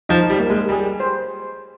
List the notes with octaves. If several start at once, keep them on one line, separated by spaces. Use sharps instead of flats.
F3 D#4
G3
A#3
G#3
G3 G#4
C5